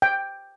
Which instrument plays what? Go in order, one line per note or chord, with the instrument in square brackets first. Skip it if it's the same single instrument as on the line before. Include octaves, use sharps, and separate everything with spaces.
[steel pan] G5